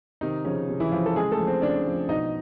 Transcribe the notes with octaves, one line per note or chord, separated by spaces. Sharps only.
C3 D#3 D#4
C#3 F3 C#4
C3
E3 E4
F3 F4
A4
C#3 G#3 G#4
A3 A4
F3
C4 C5
C#3 D4 D5
F3
B2 D#4 D#5